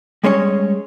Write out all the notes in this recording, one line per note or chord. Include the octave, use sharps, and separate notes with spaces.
G3 G#3 C#4 C#5